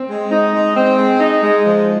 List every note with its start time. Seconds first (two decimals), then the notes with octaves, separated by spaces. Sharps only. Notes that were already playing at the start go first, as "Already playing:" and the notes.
Already playing: C4
0.10 G#3
0.31 D#4
0.54 G#3
0.76 C4
0.98 G#3
1.20 D#4
1.42 G#3
1.65 F3